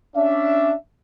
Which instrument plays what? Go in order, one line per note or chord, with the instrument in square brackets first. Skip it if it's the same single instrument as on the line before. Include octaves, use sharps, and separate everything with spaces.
[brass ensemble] C#4 D4 E5